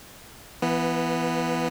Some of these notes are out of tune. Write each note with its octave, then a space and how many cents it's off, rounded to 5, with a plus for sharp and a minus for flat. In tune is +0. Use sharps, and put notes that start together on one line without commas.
E3 +20 B3 -5